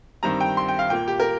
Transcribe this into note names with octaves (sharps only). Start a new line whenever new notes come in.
G2 D#3 G3 C4 A#5
G5
C6
G5
F5
A#2 A#3 G5
G4
A#4